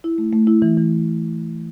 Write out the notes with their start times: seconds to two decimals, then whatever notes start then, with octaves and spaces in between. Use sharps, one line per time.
0.04 E4
0.18 A3
0.33 A3
0.47 E4
0.62 E3
0.77 E3